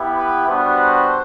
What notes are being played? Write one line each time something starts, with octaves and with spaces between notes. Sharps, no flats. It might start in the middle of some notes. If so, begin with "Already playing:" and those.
Already playing: B3 E4 G4
B4
G3 B3 D4 F#4 C5